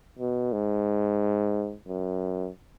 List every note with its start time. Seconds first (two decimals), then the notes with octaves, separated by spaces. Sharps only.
0.19 B2
0.53 G#2
1.88 F#2